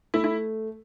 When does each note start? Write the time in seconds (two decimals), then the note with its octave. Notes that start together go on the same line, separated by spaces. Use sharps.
0.14 A3 E4
0.24 E4